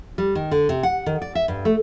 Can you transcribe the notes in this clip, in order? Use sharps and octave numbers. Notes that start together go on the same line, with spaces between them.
G3
D#3
D3
C3
F#5
D#3
D5
E5
G2
A3